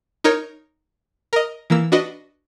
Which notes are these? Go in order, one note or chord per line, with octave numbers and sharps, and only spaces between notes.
D#4 A#4 C#5
A#4 D#5
E3 A#3 E6
D4 F#4 B4 D#5